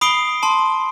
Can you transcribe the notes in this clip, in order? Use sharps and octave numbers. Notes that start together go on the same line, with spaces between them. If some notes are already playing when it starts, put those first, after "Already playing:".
B5 D#6 C7 D7 G7
A5 C6